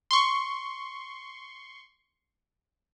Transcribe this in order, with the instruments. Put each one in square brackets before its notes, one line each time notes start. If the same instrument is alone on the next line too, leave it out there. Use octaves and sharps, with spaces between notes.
[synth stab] C6 C#6